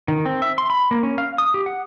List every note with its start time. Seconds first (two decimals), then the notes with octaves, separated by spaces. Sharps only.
0.08 D#3
0.26 C4
0.42 E5
0.58 C6
0.70 B5
0.91 A#3
1.03 C#4
1.18 F5
1.38 D#6
1.54 G4
1.66 F#5